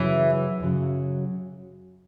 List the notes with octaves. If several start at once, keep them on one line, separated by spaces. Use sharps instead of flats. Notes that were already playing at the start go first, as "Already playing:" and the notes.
Already playing: F#2 C#3 E3 F#3
F#2 C#3 F#3